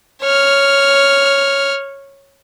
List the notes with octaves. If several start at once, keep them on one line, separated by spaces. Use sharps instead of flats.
C#5 F6